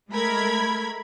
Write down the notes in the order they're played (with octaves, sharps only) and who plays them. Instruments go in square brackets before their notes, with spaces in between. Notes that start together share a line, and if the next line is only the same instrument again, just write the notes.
[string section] G#3 A3 A#4 B5 G#6